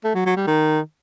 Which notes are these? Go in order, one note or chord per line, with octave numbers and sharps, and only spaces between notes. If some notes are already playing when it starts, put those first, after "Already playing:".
A3
F#3
F#3
G3
D#3